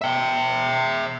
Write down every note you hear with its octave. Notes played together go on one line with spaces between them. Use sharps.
E5 G5